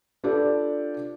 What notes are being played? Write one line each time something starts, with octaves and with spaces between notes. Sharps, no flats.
D4 F4 G4 A4 B4 D5